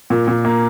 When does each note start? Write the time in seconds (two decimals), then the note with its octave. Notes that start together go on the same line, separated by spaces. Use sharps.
0.10 A#2
0.28 A#2
0.45 A#3